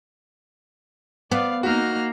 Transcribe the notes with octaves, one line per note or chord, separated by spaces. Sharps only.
B3 D5 F5
A#3 D#4 F#4 A#5 F6